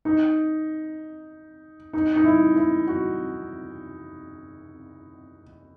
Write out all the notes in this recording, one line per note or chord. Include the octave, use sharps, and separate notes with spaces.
D#4
D#4
D#4
E4
E4
F#4